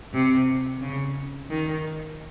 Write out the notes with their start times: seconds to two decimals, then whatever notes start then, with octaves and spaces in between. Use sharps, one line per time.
0.14 C3
0.81 C#3
1.50 D#3